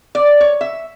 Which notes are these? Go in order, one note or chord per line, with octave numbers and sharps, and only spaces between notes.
D5
C#5
E5